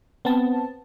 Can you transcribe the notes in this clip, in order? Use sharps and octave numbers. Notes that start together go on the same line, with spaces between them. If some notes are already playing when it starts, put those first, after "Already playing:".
B3 C4 A5